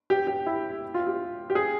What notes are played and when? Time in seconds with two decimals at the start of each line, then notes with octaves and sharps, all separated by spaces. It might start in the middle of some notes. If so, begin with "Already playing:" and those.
0.10 G4
0.27 G4
0.46 E4
0.94 F4
1.07 G4
1.50 G4
1.55 G#4